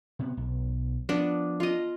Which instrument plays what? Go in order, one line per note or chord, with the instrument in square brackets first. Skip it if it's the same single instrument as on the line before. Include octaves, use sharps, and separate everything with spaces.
[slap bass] C3 B3
B1
[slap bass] F3 [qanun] B3 D4
[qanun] F4 D#5